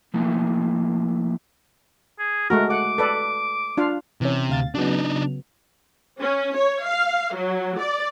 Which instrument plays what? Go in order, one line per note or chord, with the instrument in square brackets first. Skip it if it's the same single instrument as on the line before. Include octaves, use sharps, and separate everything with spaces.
[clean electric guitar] F3 A3 A#3 E4
[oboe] G#4
[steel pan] G#3 A3 F#4 [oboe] A#4
[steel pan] F#5 [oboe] D6
[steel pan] A4 B4 D5
D4 F4 F5
[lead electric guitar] C3 [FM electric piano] E3 C#4
[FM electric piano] D2 F5 A6
[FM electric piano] C#3 F#3 B3 [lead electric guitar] D4 D#4
[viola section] C#4
C#5
F5
F#3
D5